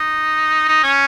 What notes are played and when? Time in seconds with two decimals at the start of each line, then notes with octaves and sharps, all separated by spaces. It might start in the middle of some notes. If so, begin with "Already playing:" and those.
Already playing: D#4
0.68 D#4
0.83 C#4